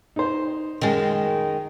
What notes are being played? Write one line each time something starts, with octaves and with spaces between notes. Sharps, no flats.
D#4 C5
F#2 D#3 G#3